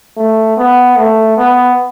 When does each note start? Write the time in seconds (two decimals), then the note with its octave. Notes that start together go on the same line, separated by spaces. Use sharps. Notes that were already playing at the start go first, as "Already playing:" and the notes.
0.17 A3
0.57 B3
0.96 A3
1.37 B3